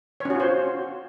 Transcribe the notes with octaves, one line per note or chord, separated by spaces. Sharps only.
C#4 F4 F#4 C5 C#5